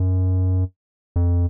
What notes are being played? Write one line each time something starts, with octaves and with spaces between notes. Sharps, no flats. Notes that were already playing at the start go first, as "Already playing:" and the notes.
Already playing: F#2
F2